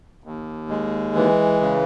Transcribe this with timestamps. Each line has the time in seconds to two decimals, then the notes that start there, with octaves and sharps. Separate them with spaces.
0.24 D#2
0.69 G#3
1.15 E3
1.61 C#3